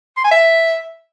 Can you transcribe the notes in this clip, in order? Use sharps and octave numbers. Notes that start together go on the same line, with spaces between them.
C6
G#5
E5